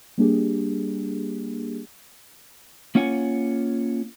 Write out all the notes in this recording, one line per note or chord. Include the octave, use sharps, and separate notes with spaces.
G3 A#3 D4 G4 G#4
A#3 C#4 F4 C#5 F#5 G#5